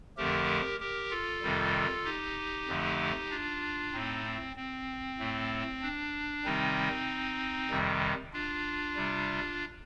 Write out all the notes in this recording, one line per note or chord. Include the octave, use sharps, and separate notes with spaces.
F2 D3 F3 A3 G4 A#4
G4 A#4
F4 A4
F2 C3 D#3 G3
D#4 G4
F2 D3 F3 A3
D4 F4
A2 A3 C4 D#4
C4
C4
A2 A3
D4
C3 D#3 G3 C4 D#4
F2 C3 D#3 G3
D4 F4
C3 G3